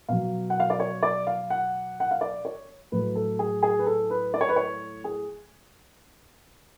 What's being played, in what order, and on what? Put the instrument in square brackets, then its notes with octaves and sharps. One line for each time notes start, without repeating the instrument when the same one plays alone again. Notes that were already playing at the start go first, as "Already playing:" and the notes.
[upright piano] B2 F#3 F5
F#5
F5
D5
C#5
D5
F5
F#5
F#5
F5
D5
C#5
A2 F#3 B4
A4
G#4
G#4
B4
A4
B4
D5
C#5
B4
C#5
G#4